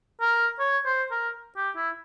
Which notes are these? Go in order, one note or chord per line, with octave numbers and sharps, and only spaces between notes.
A#4
C#5
C5
A#4
G4
E4